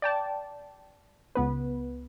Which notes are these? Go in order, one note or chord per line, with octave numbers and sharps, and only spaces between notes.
D5 G5 A5
C#2 B3 B4